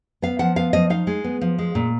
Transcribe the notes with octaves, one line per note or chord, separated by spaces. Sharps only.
B3 F5
F3 F#5
B3 F5
F3 D#5
D#4 F5
G#3
B3
F3
G#3
A#2